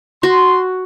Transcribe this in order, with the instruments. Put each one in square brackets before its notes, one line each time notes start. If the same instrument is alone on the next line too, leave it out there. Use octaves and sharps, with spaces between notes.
[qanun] F#4 [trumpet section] C6